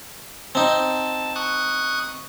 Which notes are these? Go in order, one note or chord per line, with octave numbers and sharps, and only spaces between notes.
C4 D#4 A5
C#6 D#6 F#6